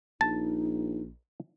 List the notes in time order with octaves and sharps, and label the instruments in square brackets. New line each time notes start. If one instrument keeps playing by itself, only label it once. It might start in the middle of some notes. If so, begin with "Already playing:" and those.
[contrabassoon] A#1 [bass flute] D#4 [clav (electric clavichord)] A5